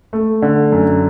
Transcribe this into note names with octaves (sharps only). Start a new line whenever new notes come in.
A3
D3
F#2